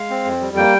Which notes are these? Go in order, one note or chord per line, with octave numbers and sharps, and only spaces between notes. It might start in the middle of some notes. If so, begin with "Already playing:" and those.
Already playing: G#3 F5
C4
F2
G3
A#3 G5